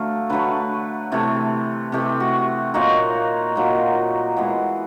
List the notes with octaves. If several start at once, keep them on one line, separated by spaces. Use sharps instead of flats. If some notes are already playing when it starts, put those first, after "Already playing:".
Already playing: D3 F#3 A3 F5
D3 F#3 A3 B4
C3 E3 A3
C3 E3 A3 G4
F#4
A#2 F#3 A#3 D#4 F#4
A#2 F#3 A#3 D#4
E3 G#3 B3